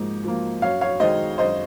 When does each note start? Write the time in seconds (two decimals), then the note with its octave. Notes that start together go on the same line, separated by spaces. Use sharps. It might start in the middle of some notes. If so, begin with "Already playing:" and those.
Already playing: G#2 F3 A#3
0.24 F3 A#3
0.62 F#2 C#5 F5
0.81 C#5 F5
1.00 D#3 G#3 C5 D#5
1.38 F#2 C5 D#5